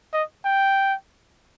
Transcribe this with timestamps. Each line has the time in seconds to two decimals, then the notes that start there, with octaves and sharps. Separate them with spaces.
0.13 D#5
0.45 G5